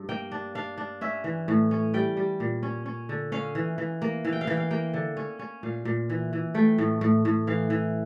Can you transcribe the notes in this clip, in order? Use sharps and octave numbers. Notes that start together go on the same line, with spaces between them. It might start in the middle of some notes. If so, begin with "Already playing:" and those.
Already playing: G2
A#3 G5
D4
D4 F5
D4
C#4 E5
E3
A2
C#4
G3 G5
G3
A#2
C#4
C#4
D3
C#4 F5
E3
E3
A#3
E3 F5
G5
F5
E3 G5
F5
A#3 G5
D3
C#4
C#4
A#2 F5
A#2
E3
E3
A3 G5
A2
A2
A2
E3 F5
E3